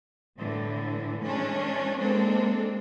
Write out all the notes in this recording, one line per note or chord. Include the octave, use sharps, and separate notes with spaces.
A2 D3 E3
E3 G#3 C#4 D4
G#3 A#3 C4 D4 A4